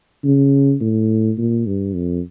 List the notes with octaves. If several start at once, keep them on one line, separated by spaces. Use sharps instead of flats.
C#3
A2
A#2
G2
F2